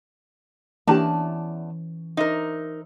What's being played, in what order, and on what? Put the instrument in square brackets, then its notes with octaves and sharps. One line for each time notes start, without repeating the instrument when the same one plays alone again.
[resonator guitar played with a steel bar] E2 D5 A5 [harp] E3 C#4 [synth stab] A#3 D4 G4
[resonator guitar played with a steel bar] D#4 A#4 [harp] C5 D5 E5